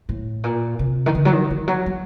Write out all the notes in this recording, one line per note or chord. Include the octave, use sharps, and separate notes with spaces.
A2
A#2
C3
D#3
D3
F#3
D#3
D#3
F#3
F#3